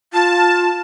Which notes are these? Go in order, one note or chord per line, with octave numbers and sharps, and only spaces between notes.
F4 A5